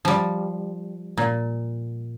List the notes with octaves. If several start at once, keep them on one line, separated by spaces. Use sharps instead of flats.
F3 G3
A#2